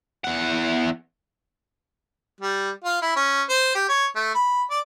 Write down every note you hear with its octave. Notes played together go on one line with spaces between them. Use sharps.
E2 F#5
G3
F4
E4
C#4
C5
G4
C#5
A3
B5
D5